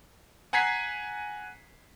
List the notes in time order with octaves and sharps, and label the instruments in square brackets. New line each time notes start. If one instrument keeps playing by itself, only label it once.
[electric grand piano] F#5 G#5 A#5 G#6 B6 C7